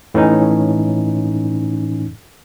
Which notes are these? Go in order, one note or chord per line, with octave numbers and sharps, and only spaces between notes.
A2 E3 C#4 D#4